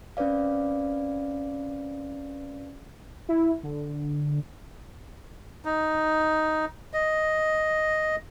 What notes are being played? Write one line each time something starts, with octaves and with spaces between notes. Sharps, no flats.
C4 C#4 B4 D5 F5
E4
D3
D#4
D#5